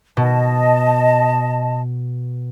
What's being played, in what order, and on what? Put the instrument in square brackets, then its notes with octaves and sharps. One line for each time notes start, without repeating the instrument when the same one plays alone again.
[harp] B2 [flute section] D#5 A5